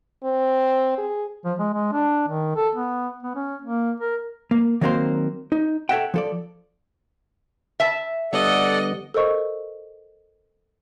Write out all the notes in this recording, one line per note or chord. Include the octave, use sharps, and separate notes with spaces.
C4
G#4
F3
G#3
G#3
D4
D#3
A4
B3
B3
C#4
A#3
A#4
A#3
D#3 F#3 A#3 C4 A#4 C5
D#4
A4 C#5 D#5 E5 F#5 G5
F3 A4 D5
E5 A5
D3 G3 B3 A4 D5 D#5 F#5
A4 A#4 C5 D#5 C#6